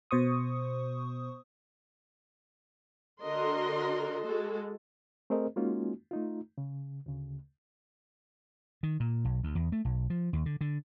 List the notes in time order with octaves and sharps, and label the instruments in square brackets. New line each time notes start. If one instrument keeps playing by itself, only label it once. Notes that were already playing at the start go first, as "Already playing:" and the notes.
[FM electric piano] B2 C5 C#6 D#6
[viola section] D3 F#4 A#4 D#5 C6
G#3 F#4 A4
[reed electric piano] A3 C4 G#4 A#4 C5 D#5
G#3 A#3 C#4 D#4 F4 F#4
A3 D#4 F4
C#3
D2 C#3
[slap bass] D#3
A#2
B1
D2
E2
A3
B1
F3
D#2
D3
D3